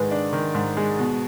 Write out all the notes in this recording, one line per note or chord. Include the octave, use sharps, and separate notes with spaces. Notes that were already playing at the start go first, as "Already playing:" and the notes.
Already playing: G#2 D#3 G#3 D4 B4
D4
D#3
G#2
G#3
B2